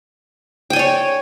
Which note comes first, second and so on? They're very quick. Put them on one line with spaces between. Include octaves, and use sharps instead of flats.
G5 G#5 D5 C#5